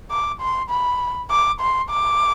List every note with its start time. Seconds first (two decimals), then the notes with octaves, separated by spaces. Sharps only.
0.11 D6
0.41 C6
0.70 B5
1.30 D6
1.61 C6
1.90 D6